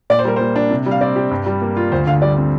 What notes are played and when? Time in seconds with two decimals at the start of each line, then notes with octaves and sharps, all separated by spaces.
0.10 A#2 D5
0.19 C5
0.25 G3 A#4
0.36 A#3 C5
0.56 D4
0.71 C3
0.86 G3 F5
1.01 C4 D5
1.16 G4
1.31 G2
1.46 G3
1.62 A#3
1.77 F4
1.92 D2 C5
2.07 D3 F5
2.22 G3 D5
2.37 C4